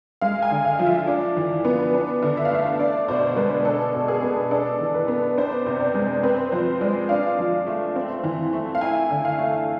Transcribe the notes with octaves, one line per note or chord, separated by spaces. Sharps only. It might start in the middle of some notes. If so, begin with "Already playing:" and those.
G#3 F5
G#5
D3
F5
F3
E5
D4
E3
B3
D4
D3
E5
F5
A3 E5
D4 D5
B2 C5
G#3 B4
D4 A4
B2
G#4
B3
D4 A4
E3
B4
B3
D4 C5
C3
D5
G#3
C4 B4
F3 C5
G#3 D5
D4 F5
F3
A3
C4
E3
A3
F5
E4 G#5
D3
F5
A3